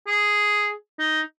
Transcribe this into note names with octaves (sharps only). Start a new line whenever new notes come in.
G#4
D#4